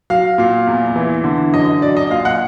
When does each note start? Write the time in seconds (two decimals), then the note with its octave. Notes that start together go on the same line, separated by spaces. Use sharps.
0.10 F#3 F5
0.38 A#2 F5
0.67 E2
0.96 E3
1.24 D3
1.53 F#2 D#5
1.82 F#3 D5
1.97 D#5
2.10 A#2 F5
2.25 F#5